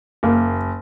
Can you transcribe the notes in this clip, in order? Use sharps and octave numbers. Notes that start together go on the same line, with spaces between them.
F#1 A#3